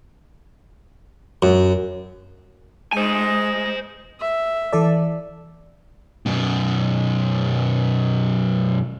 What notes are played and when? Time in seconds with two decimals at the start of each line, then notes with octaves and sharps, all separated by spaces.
1.42 F#2
2.93 G#3 C5 G#5
4.20 E5
4.73 E3 A4 D5
6.26 F#2 B2